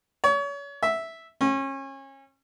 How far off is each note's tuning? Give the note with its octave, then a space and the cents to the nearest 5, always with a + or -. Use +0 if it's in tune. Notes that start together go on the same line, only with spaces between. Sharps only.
C#5 +35
E5 -5
C#4 -30